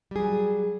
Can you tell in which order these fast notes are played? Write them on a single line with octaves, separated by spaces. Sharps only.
G3 G#4 F#3